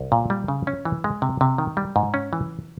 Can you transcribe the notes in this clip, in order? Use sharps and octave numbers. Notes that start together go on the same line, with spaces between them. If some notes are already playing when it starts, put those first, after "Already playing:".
Already playing: C2
A#2
G3
C#3
C#4
E3
G#3
C3
C3
D#3
G3
G#2
C#4
E3